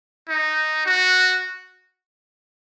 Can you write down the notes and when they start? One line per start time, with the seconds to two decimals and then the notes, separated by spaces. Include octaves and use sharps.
0.29 D#4
0.86 F#4